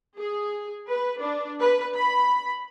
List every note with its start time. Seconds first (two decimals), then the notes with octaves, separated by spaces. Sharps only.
0.18 G#4
0.88 B4
1.19 D4
1.61 B4
1.96 B5